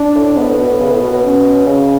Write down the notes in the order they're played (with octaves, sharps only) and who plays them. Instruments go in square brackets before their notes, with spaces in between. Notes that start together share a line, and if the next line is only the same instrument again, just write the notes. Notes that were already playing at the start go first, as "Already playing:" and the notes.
Already playing: [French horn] D4
[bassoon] A2
[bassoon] G#2 [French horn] B3
[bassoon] A2
B2
A2
C#3
A2
B2
B2
[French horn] C#4
[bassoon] C#3 [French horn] C#4